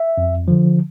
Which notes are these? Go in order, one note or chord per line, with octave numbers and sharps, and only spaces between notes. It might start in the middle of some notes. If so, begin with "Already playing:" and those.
Already playing: E5
F2
D3 F3